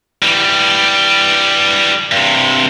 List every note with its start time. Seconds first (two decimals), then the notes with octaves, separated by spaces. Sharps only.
0.23 E3 G3
2.12 G2 C3